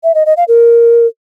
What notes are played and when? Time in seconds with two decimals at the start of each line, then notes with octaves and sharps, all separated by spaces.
0.04 E5
0.15 D#5
0.26 D#5
0.37 F5
0.48 A#4